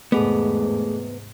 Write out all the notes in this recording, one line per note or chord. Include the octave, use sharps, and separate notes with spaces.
E2 G#2 C3 A3 B3 G#4 A4